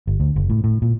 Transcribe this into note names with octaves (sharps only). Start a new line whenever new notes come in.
G1
D2
F#1
A2
A2
A#2